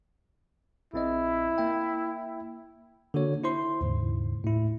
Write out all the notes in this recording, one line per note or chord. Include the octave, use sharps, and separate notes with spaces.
A#1 C4 E4 D#5
A#3 E5 G5
D3 A#3 F#4 C#5
E4 C5 C6
D#2 G#2 C#3
A2 E4